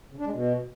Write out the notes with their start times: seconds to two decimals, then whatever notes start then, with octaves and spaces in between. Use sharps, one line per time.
0.12 C#3
0.18 D4
0.25 G#3
0.32 B2